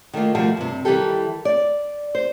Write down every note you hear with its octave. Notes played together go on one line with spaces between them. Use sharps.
D#3 A3 A#3 F4
D#2 B2 F3 G3 A3
G2 C3
D#3 E3 G3 E4 G4 A4
D5
C5